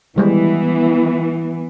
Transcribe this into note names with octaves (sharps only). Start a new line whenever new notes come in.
D#3 E3 G3 G#3 B3